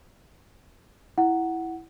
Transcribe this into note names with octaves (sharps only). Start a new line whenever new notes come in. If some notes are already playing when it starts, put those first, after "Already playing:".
E4 F#5